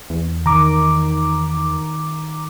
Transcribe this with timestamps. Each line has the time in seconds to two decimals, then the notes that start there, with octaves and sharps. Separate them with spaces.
0.10 E2
0.46 D#3 A#5 D6